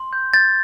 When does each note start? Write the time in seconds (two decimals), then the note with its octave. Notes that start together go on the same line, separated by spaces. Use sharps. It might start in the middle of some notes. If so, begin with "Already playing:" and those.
Already playing: C6
0.13 G6
0.33 G6 A6